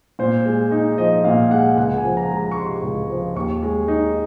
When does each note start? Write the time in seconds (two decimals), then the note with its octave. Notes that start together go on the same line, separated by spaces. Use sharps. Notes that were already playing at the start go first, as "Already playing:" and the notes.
0.19 A#2 C5
0.45 G#3
0.71 D#4
0.98 F3 D#5
1.24 A#2 F5
1.51 G#3 F#5
1.77 C#2 F#5
1.98 G#5
2.04 F3
2.17 A#5
2.31 G#3
2.37 A#5
2.52 C#6
2.57 C3 C6
2.83 C#2
3.09 F3
3.36 D#2 C#6
3.63 G#3
3.88 D#4